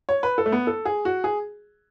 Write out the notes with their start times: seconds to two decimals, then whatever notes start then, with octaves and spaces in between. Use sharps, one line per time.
0.09 C#5
0.23 B4
0.38 A4
0.46 A3
0.52 B3
0.67 A4
0.85 G#4
1.05 F#4
1.24 G#4